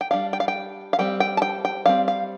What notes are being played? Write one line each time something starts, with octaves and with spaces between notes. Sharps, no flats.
G5
G3 D4 F5
G5
F5
G5
F5
G3 C4 G5
G5
A5
G5
G5
G3 C4 F5
F5